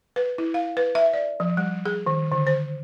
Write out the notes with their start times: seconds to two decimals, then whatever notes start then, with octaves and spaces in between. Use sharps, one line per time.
0.16 B4
0.38 E4
0.54 F5
0.77 B4
0.95 E5
1.13 D5
1.40 F3
1.57 G3
1.86 G#4
2.07 D#3
2.32 D3
2.47 C5